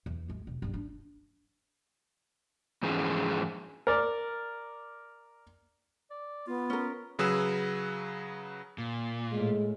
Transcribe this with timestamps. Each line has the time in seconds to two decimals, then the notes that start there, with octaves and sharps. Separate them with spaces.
0.06 E2
0.28 A1 G#3
0.47 E1
0.62 C#2 G2
0.74 D4 D#4
2.83 F2 G#2 E3 C#4 G#4
3.87 A#4 D5
6.10 D5
6.47 B3 F4
6.70 C#4 A#4
7.19 C#3 F#3 G#4 B4 E6 E7
8.78 A#2
9.32 A2 G#3